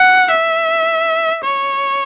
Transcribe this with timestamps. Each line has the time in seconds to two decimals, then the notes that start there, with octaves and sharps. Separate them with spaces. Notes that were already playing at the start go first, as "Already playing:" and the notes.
Already playing: F#5
0.31 E5
1.44 C#5